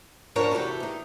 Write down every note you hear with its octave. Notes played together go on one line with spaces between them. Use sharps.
G#2 F3 D4 A#4 C#5 F#5
C3 E3 A3 F#4 G4
D#3 D#4